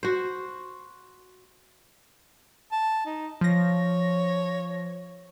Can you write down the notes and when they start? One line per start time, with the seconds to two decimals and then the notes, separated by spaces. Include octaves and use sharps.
0.03 F#4 C5
2.72 A5
3.06 D#4
3.41 F3 C#5 A#6